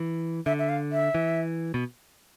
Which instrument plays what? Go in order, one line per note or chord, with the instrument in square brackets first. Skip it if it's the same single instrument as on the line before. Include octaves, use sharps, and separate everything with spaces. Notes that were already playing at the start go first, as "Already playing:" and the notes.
Already playing: [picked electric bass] E3
[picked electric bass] D3 [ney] E5
[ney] E5
F5
E5
[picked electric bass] E3
B2